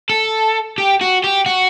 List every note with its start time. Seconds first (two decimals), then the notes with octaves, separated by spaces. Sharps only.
0.10 A4
0.78 G4
1.01 F#4
1.24 G4
1.46 F#4